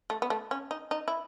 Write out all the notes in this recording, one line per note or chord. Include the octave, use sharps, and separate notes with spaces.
A3
B3
A3
C#4
D#4
D#4
E4